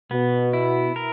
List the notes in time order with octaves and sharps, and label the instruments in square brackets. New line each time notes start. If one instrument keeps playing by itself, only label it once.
[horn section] B2 [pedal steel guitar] B3
[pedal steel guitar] E4
A#4